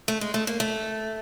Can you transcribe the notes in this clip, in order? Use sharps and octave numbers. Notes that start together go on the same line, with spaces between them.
A3
G#3
A3
A#3
A3